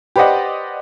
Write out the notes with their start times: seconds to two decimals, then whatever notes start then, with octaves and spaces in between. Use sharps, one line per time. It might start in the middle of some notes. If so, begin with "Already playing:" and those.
0.16 G4 B4 C5 D5 D#5 F#5